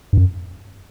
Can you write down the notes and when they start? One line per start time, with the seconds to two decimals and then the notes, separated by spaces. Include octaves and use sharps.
0.13 G2
0.17 F#2